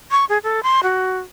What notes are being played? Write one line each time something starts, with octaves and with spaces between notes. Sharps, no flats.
C#6
G#4
A4
C6
F#4